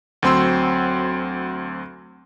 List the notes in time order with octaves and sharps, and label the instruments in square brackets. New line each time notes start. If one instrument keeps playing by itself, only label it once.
[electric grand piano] D2 F#3 C4 C6 E6